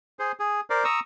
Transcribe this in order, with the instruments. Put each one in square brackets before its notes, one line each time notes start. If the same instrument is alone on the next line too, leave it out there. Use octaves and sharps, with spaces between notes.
[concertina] G#4 C5
G#4
A#4 C5 D5
A#5 C#6 D#6 E6